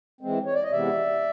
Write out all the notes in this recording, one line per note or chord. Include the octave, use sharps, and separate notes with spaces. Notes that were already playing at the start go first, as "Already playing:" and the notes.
E3 G#3 C4
C#5
D5
D#5
C3 E3 G#3 B3 D5 E5